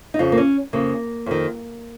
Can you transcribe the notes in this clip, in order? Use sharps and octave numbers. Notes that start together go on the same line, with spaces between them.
D#4
F2 C#3 F4
A#3
C#4
F2 C#3 A#3
F2 D#3